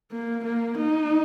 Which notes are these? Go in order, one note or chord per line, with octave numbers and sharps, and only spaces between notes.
A#3
A#3
D#4